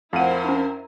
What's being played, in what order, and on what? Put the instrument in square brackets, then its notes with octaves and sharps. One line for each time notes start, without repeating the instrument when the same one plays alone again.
[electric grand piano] F2 D#7 [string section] E4 A#4 C5 [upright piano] F5 F#5
[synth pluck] C#4 D4